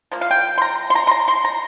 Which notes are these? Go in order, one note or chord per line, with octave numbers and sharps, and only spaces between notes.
F3 A#3
F5
G5
C6
A#5
C6
A#5
C6
A#5
C6
A#5